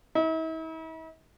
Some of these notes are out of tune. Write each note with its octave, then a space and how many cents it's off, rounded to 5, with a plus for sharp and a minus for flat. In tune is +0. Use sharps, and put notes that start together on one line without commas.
E4 -45